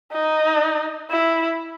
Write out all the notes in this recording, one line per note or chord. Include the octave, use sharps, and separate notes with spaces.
D#4
E4